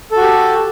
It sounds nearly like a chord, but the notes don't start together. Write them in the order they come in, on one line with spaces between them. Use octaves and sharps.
A4 F#4 G4